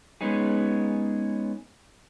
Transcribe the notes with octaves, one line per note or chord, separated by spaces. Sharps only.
G#3 B3 C#4 D#4 G#4